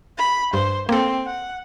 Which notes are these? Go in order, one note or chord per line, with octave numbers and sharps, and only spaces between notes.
B5
G2 C5
A#3 C4 A4
F#5